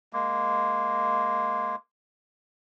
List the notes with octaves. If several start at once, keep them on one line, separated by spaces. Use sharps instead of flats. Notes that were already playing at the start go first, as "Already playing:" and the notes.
G#3 A#3